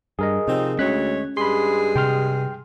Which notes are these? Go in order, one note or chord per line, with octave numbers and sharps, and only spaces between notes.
G2 G#4 A#4 D#5
C3 F3 C4 D#4
D2 G#3 C#4 C#5 F#6 B6
G2 G#3 G#4 B5 C6
C3 G5 C6 F6